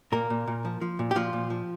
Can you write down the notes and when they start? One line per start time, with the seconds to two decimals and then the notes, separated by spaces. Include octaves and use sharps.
0.12 A#2 A#3 A#4
0.30 A#2
0.47 A#2
0.65 F3
0.81 F3
0.99 A#2
1.11 G4
1.15 A#2 F3 F4
1.33 A#2
1.50 F3